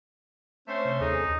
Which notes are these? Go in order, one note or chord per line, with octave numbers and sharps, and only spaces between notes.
A3 C4 C#4 C5
C3
D#2 D#4 G#4 A4